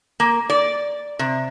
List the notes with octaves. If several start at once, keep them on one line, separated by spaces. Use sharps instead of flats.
A#3
D5
C3